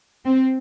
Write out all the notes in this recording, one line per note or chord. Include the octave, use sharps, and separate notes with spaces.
C4